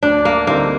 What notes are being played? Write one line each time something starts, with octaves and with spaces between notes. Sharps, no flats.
D2 D4
A#3
D3 G3 A#3 C4 D#4